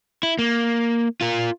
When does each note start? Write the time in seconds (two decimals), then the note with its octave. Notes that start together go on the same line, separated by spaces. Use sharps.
0.23 E4
0.39 A#3
1.21 F4 A#4